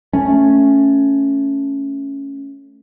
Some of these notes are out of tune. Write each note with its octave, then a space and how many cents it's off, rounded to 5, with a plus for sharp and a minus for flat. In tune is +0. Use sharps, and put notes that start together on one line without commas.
A3 +0 C#4 +0